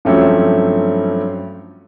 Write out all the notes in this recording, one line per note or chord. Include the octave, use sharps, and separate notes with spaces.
G2 F3 F#3 A3 C4 C#4